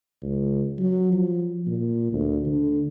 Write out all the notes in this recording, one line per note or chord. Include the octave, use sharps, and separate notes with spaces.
C#2
F#3
F3
A#2
D2
D3